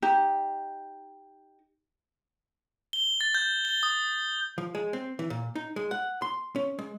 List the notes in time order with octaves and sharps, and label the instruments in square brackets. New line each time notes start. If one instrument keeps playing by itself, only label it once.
[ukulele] D#4 G4
[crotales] G7
A6
G6
G7
D#6
[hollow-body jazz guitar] F3
G#3
C4
E3
A#2
D#4
G#3
F#5
C6
C#4
G#3